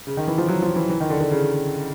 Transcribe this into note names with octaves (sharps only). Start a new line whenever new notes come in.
C#3
D#3
E3
F3
F#3
F3
E3
E3
D#3
D3
D3
C#3